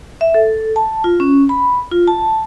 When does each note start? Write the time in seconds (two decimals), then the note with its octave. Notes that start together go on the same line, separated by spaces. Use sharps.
0.21 E5
0.34 A4
0.76 A5
1.04 F4
1.20 C#4
1.49 B5
1.92 F4
2.07 A5